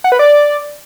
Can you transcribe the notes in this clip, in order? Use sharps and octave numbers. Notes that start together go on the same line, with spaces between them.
F#5
B4
D5